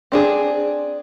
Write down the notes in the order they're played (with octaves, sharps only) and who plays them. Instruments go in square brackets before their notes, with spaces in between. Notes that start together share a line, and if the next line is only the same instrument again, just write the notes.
[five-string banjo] C4 D4 G#4